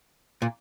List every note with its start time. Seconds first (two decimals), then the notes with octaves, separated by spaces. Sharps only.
0.42 A#2